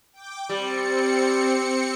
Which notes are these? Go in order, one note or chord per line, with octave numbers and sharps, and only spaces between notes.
G5 D6
G3 C4 C#7